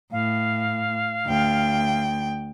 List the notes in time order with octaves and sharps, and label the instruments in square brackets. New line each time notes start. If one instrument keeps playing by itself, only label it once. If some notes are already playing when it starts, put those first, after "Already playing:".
[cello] A2 [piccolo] F5
[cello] D2 G5